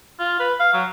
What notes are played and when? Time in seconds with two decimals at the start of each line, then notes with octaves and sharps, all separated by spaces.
0.20 F4
0.40 B4
0.60 F5
0.74 F#3